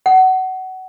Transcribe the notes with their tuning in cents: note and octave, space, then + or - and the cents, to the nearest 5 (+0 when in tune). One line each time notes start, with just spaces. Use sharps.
F#5 +25